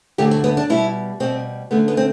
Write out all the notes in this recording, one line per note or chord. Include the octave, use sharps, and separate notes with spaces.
D2 D3 F#3 A3 G4
F#4
B3
D4
B2 G3 E4
B2 G3 C4
F#2 D3 A3 B3
B3
C4